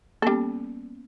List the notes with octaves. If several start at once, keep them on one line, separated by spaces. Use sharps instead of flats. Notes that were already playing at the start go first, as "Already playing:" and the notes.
G3 A#3 B3 C#4 A4